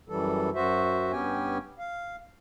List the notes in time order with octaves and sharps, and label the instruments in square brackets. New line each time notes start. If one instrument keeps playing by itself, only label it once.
[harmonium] F#2 E3 G3 A4
F#2 F#4 C5 E5
G2 B3 C#4 G4 G5 G#5
F5